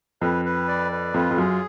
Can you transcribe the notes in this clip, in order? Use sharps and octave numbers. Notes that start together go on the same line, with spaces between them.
F2 B4
B4
D5
B4
F2 F4
F2
F#2 G#4